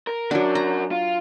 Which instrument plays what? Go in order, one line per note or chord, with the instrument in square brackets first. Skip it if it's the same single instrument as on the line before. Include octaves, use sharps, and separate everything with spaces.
[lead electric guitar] A#4
[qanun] F#3 D4 [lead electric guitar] F#4 A#4
[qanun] A#5
[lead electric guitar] F4